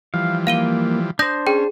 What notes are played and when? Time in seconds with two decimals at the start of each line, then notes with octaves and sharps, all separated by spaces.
0.14 E3 F3 G3 F5
0.47 A#3 F5 D#7 G7
1.19 D4 C5 D#6 G6 A#6
1.47 C#4 G#4 G5